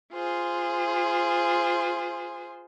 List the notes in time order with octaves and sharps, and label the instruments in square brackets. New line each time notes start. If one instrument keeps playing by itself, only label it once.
[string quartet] F4 G#4 C5